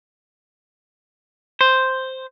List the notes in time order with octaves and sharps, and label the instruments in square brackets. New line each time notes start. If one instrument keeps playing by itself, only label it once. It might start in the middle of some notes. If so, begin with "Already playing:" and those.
[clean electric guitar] C5